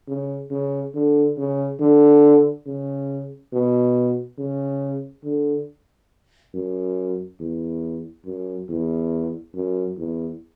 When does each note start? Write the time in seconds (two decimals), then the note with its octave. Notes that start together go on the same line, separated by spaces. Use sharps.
0.08 C#3
0.51 C#3
0.95 D3
1.37 C#3
1.81 D3
2.66 C#3
3.53 B2
4.38 C#3
5.24 D3
6.54 F#2
7.40 E2
8.26 F#2
8.69 E2
9.55 F#2
9.98 E2